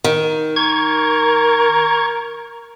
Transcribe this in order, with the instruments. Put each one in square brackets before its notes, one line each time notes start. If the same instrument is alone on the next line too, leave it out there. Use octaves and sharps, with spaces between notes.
[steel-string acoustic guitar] D#3
[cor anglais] A#4 [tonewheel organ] C#6 G#6